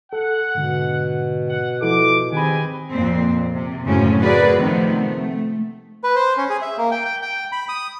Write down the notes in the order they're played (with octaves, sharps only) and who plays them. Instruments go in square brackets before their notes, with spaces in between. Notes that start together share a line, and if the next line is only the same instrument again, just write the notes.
[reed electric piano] A4 [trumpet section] F#5
[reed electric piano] G#2 D3 [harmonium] B2
[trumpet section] F#5
[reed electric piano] F3 E4 A4 [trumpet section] D6
[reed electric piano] D#3 B5 [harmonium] C4 G4 G#4 [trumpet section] B4 D#5 G#5
[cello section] F2 A#2 C4
C3
F#2 A2 C#3 F#3 C4 C#4
F#4 G#4 A#4 B4 D5
C3 D#3 F3 A3 B3 C4
A3
[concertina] B4
C5
C#4
G#4
E5
A#3
G5
G5
G5
B5
D#6